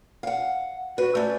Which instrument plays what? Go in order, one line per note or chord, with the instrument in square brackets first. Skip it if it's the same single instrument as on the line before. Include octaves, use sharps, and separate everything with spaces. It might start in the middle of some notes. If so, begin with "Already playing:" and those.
[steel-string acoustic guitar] F5 F#5
[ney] F#4 [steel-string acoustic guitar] B4
[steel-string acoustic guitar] A3 C#4 [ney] D5